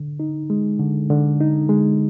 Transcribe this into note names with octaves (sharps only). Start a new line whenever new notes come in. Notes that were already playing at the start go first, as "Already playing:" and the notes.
Already playing: D3
D#4
G#3
D3
D3
D#4
G#3